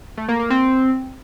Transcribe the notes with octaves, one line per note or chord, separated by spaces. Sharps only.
A3
A#3
A#3
C4